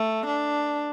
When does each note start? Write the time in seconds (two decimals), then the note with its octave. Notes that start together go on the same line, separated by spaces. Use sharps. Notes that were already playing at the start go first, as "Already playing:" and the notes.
Already playing: A3
0.26 D4